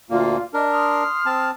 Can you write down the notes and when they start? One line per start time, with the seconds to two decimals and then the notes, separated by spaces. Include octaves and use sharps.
0.10 D2 A#2 A#3 F4
0.54 D4 A#4 D#5
0.71 C6 D#6 F6
1.26 C4 A5